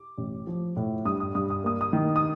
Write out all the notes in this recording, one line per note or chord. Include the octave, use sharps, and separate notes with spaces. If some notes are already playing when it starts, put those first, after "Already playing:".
Already playing: D6
A1
F3
A2
G2 D#6
D#6
G2 D#6
D#6
A#3 D#6
D#6
D#3
D#6